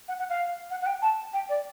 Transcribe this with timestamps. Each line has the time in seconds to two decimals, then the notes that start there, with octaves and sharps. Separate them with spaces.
0.08 F#5
0.19 F#5
0.29 F5
0.70 F#5
0.81 F#5
0.86 G5
1.02 A5
1.33 G5
1.49 D5